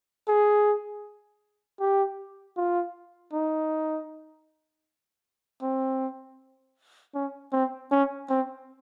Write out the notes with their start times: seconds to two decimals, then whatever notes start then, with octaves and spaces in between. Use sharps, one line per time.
0.28 G#4
1.80 G4
2.57 F4
3.33 D#4
5.62 C4
7.14 C#4
7.52 C4
7.91 C#4
8.29 C4